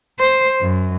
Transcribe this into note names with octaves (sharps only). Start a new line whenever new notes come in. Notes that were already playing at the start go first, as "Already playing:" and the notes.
C5
F#2